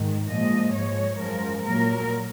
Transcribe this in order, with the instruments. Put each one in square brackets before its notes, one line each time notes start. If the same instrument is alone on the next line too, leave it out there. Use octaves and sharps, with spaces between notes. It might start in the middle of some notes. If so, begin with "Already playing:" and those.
Already playing: [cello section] G#2 D#3
A#2 F3 G#3 D#5
G#2 F3 G#3 C#5
F#2 F3 G#3 A#4
A#2 F#3 A#4